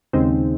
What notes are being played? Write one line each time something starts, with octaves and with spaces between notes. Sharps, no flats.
D#2 C#3 G#3 C4 D#4